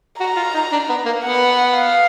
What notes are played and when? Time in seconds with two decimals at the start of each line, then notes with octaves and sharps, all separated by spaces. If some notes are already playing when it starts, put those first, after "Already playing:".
0.20 F#4 A#5
0.36 F4
0.54 D#4
0.72 D4
0.89 B3
1.06 A#3
1.24 B3 F#5
1.76 F5